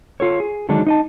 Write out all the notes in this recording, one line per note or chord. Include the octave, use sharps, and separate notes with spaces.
F4 A4 C#5
G#4
D3 D#3 F#3 G#3 D4 D#4
D#4 D#5 A5